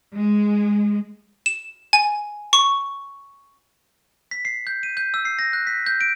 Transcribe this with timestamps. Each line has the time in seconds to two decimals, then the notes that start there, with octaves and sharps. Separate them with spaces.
0.16 G#3
1.46 E7
1.93 G#5
2.53 C#6
4.31 B6
4.45 C7
4.67 G6
4.83 D#7
4.97 G6
5.14 E6
5.25 C7
5.39 A#6
5.53 F#6
5.67 B6
5.86 G6
6.01 D7